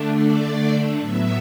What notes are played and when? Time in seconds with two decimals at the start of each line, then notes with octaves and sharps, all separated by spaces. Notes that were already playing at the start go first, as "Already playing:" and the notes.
Already playing: D3 A3 D4
0.12 D5
0.99 A2 F#3 B3 E5